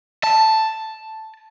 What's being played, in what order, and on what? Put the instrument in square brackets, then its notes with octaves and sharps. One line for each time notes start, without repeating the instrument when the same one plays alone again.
[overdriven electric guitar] A5